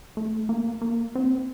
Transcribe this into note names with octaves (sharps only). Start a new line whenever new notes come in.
A3
A#3
A#3
C4